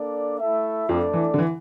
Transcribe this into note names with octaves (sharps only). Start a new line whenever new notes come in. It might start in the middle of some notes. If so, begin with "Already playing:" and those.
Already playing: A#3 D4 A4 D5
A3 E4 A4 E5
F2 F3 A3 D4 A4 D5
E3
D3
E3